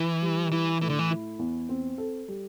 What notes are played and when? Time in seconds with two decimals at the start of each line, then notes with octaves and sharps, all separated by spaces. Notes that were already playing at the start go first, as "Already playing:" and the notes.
Already playing: E3 E4
0.22 G3
0.52 E3 E4
0.81 A2 E3
0.90 D3
0.99 E3
1.10 E4
1.39 E2
1.69 C4
1.98 A4
2.28 G3